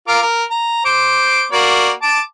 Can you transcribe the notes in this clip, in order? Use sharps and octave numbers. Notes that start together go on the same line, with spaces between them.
F4 A#4 D6
A#4
A#5
C5 D6
A#3 F#4 D5
A5 D6